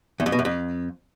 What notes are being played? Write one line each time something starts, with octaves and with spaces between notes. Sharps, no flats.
E2
F2
B2
F#2
F2